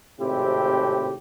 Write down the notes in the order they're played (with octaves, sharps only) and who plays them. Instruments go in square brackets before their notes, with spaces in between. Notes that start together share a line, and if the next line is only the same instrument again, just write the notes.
[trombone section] G#1 A2 C3 C4 E4 G4